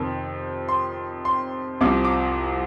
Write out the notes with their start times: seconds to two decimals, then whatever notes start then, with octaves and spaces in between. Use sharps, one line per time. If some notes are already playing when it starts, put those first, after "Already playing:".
Already playing: F2 C3 D#3
0.68 C6
1.25 C6
1.81 C2 C3 F3 D6
2.05 D6